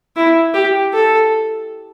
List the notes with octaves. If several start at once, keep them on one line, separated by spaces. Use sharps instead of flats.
E4
G4
A4